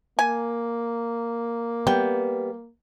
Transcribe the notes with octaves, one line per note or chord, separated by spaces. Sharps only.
A#3 G#5
G3 B3 G5